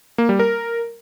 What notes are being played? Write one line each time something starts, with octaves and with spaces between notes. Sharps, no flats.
A#3
G3
A#4